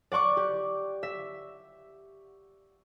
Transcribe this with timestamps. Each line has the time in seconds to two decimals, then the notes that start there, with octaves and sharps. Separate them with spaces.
0.12 D5 F#5 C#6 D6
0.37 G4
1.03 E5